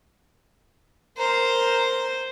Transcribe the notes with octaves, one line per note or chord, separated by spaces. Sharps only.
A#4 C5